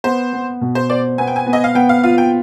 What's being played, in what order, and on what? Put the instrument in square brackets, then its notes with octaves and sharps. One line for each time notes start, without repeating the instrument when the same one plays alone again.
[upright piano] B3 [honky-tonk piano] C5
[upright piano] B3
B2
[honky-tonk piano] C5
[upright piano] C5 [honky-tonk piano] D5
[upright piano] B3 [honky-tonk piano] G#5
[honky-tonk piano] G5
G#5
[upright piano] B3
[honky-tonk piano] D#5
F5
[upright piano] B3 [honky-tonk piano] G5
[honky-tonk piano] F5
[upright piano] F4 [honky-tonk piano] F5
[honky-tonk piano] G5